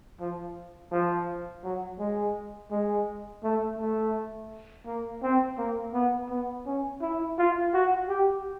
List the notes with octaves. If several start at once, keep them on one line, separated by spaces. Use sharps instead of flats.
F3
F3
F#3
G#3
G#3
A3
A3
A#3
C4
A#3
B3
B3
C#4
E4
F4
F#4
G4